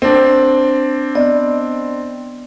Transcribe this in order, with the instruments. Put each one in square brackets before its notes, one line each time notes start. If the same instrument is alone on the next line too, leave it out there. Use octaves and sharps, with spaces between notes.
[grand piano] C4 D4
[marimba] B3 D5 D#5